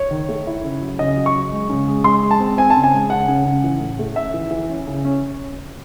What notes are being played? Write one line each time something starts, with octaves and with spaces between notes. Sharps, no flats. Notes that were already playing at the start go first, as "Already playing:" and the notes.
Already playing: C#5
D#3
A3
E4
C#3
F#3
C#3 D#5
F#3
C#6
F#3
G#3
C#3
G#3
G#3 C6
G#3
A5
C4
C4 G#5
A5
C#3
G#5
G#3
C#3 F#5
C#3
C#3
E3
A2
A3
C#4 E5
E3
E3
C#4
C#3
C#4